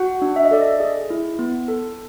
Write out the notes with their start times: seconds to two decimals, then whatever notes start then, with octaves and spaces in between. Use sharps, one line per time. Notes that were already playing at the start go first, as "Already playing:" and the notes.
Already playing: F#4 F#5
0.22 D4
0.36 E5
0.45 D#5
0.51 A4 D5
0.62 D#5
0.80 G#4
1.10 E4
1.39 B3
1.68 A4